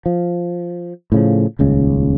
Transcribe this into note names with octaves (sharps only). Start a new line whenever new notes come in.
F3
A2 C#3 F3
D#1 C#2 C#3